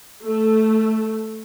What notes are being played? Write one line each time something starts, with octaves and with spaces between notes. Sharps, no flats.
A3